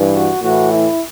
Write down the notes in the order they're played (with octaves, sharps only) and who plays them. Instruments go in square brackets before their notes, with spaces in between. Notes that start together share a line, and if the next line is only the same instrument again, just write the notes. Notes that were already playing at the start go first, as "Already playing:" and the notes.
Already playing: [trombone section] G2 E3
F#4
A2 E3 F#4
E4